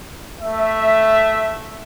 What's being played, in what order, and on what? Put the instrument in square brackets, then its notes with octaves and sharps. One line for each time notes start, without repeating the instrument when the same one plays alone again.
[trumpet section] A3 E5